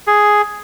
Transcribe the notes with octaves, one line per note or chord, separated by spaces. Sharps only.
G#4